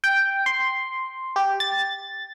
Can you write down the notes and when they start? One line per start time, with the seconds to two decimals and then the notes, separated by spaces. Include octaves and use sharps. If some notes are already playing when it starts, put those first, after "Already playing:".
0.04 G5
0.46 C6
1.36 G4
1.60 A6